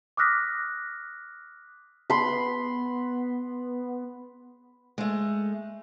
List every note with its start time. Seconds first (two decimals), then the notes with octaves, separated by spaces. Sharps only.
0.17 D6 D#6 F6 F#6 A#6 B6
2.10 B3 B5 C6
4.98 G#3 A3